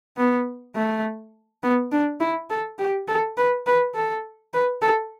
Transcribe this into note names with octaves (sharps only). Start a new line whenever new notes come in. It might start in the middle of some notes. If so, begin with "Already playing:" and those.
B3
A3
B3
D4
E4
A4
G4
A4
B4
B4
A4
B4
A4